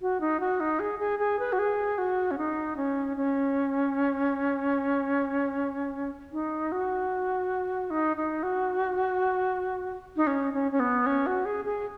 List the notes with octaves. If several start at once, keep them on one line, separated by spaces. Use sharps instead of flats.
F#4
D#4
F#4
D#4
G#4
G#4
G#4
B4
F#4
G#4
F#4
C#4
D#4
C#4
C#4
D#4
F#4
D#4
D#4
F#4
D#4
C#4
C#4
C#4
B3
C#4
F#4
G#4
G#4